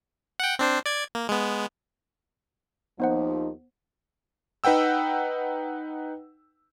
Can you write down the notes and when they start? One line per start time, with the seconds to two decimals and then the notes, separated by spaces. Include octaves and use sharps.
0.40 F#5 G5
0.59 C4 D4 C5
0.86 D5 G#6
1.15 A#3
1.29 G#3 B3
3.00 D#2 F3 B3 D#4 C5 F#5
4.64 D#4 B4 F#5 G5 E6